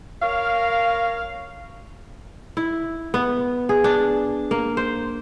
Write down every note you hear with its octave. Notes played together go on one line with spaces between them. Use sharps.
A#4 C#5 F5
E4
B3
G#4
D4
A#3
C5